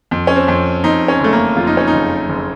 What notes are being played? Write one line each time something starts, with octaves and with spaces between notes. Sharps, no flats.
F2
C#4
C4
F2
F2 D#4
C#4
F#1 A3
A#3
F2 F4
D#4
C#4
D#4
F#1
F#1